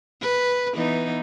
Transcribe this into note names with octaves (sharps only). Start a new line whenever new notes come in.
B4
E3 B3 D#4